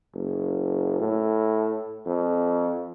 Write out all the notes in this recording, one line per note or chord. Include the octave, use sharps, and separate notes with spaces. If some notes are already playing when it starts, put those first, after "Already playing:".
F#1
A2
F2